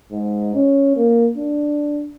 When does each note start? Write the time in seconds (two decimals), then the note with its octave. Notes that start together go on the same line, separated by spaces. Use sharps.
0.12 G#2
0.54 C#4
0.96 A#3
1.37 D4